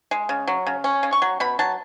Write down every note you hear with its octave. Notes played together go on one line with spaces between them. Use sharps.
G#3
C#3
F#3
C#3
C#4
C#3
C#6
F#3
B2 B5
F#3 A5